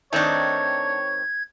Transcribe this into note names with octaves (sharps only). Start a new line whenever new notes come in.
D#3 A3 C4 D4 D#4 C#5 G#6